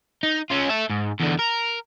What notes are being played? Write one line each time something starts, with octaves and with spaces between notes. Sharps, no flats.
D#4
C#4 F4
A4 E5
G#2
E2 D3
A#4